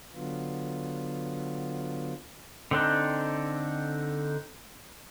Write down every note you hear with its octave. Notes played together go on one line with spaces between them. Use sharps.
D3 F#3 B3 F4
D3 C4 D4 D#4